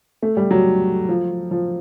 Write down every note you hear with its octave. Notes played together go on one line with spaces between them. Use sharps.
A3
G3
F#3
F3
F3